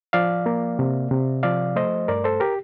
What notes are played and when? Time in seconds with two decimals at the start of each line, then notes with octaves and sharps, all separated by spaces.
0.13 F3 D5 F5
0.46 A#3
0.79 C3
1.11 C3
1.43 F3 D5 F5
1.76 A3 C5 D#5
2.08 G2 A#4 D5
2.24 A4 C5
2.40 G4 A#4